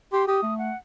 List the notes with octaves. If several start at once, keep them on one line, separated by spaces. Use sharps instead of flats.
G4 C6
G4 D#6
A3
F#5